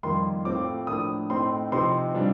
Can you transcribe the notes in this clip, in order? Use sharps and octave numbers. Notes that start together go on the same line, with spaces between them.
F2 D#3 G3 A#3 F4 C6
A2 A3 C4 F4 D6
A2 F3 A#3 D4 D#6
A2 A3 C4 D#4 C6
C3 F3 C4 D#4 C6
C3 G3 D4 F4